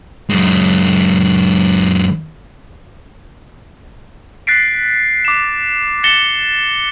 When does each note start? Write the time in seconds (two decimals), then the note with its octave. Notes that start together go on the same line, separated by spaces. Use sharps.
0.30 F#2 G#3
4.47 F#6 A6 B6 C7 D7
5.25 D6 E7
6.04 A6 A#6 C#7 E7 G7